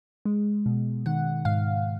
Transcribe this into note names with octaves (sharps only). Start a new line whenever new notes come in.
G#3
B2
D#3 F#5
G#2 F5